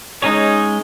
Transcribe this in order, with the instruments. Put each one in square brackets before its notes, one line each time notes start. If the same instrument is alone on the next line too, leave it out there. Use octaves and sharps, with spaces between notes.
[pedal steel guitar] G#3 C#4 G#4 C#5 [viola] D#4